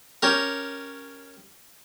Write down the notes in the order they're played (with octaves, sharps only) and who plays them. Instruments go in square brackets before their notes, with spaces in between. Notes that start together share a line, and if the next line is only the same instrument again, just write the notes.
[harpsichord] C#4 G4 A#4